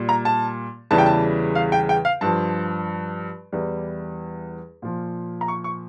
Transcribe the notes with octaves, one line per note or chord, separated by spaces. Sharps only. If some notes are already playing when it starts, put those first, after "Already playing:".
Already playing: A#2 G3
A#5
A5
E2 C#3 E3 G3 A5
G5
A5
F5
G5
G5
F5
G2 F3 A5
E2 E3 G3
A#2 F3
A#5
C#6
C#6